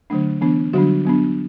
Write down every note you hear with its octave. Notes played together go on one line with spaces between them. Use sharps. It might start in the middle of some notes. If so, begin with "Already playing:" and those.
D3 F#3 A3 D4
E3 B3 D4
D3 F#3 G3 D4 F#4
F#3 B3 D4